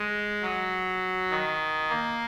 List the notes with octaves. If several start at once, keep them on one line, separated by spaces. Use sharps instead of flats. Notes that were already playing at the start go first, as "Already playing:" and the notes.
Already playing: G#3
F#3
D#3
A#3